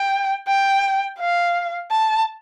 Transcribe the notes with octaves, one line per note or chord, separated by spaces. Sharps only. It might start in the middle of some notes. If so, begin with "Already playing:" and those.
Already playing: G5
G5
F5
A5